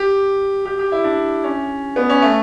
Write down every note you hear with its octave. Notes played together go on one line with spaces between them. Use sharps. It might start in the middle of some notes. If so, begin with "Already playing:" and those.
Already playing: G4
G4
G4
E4
D4
C#4
B3
C#4
A3